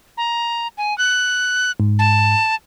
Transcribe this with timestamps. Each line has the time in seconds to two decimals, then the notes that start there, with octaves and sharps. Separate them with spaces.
0.18 A#5
0.78 G#5
0.98 F#6
1.80 G#2
1.99 A5